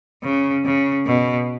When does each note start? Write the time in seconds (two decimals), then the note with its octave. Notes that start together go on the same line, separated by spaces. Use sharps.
0.23 C#3
0.65 C#3
1.06 B2